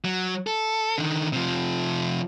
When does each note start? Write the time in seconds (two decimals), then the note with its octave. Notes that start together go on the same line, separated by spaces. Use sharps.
0.05 F#3
0.47 A4
0.98 D3 D#3
1.33 C3 F3